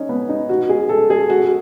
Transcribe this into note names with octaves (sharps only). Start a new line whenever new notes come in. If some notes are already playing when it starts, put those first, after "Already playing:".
Already playing: C#4 D#4
B3
D#4
F#4
G#4
A4
G#4
F#4